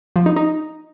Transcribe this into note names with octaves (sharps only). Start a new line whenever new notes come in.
F3
D#4
D#4